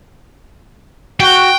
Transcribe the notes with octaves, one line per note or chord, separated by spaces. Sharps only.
F#4 G5